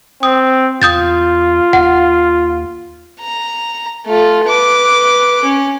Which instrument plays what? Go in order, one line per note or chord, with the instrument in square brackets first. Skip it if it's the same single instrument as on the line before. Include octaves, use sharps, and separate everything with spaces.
[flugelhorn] C4 [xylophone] D#6
[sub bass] E2 [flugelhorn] F4 [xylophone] D#6 G6 A6
[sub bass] D#2 [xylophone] F#5
[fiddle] A#5
A3 F4
B4 D6
C#4